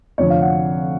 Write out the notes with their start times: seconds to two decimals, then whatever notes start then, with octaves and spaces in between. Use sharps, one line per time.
0.18 F1 F2 D3 C#5
0.30 F5
0.42 F#5